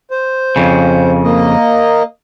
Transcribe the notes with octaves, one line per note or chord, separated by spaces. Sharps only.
C5
F2 C#3
A#3 D#5